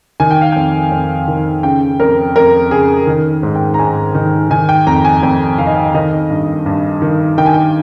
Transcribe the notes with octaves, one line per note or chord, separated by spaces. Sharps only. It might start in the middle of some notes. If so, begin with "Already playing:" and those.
D#3 G#5
G5
F5
F2 G5
F2
D#3
C#3 G5
F2 A#4
F2 A#4
C#3 G#4
D#3
G#2
G5
A#5
G#2 G#5
D#3
D#3 G#5
G5
F2 A#5
G#5
F2 G5
D#3 F5
D#5
F5
D#3 D#5
G2
G2
D#3
D#3 G5
G#5
G5